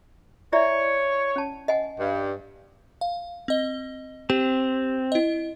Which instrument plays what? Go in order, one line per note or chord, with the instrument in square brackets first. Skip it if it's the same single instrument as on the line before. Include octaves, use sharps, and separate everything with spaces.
[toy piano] E4 D5 E5 [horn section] C#5
[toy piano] C#4 A5
D#5 F#5 G#5
[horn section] G2
[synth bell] F5
C4 D#5 G7
[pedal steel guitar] C4 [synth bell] G4
[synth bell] E4 D#5